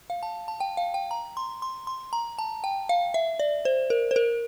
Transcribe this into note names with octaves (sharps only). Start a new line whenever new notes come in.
F5
A5
A5
G5
F5
G5
A#5
C6
C6
C6
A#5
A5
G5
F5
E5
D5
C5
A#4
C5
A#4